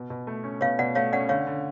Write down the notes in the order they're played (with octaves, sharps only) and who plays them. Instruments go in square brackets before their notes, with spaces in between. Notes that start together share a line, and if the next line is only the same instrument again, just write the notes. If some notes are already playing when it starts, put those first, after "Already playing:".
Already playing: [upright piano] B2
B2
A3
C#4
[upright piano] B2 [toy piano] C#5 F5
[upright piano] B2 [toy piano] D5 F#5
[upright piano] A3 [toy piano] C#5 F5
[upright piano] C#4 [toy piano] D5 F#5
[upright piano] D3 [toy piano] C#5 F5
[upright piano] D3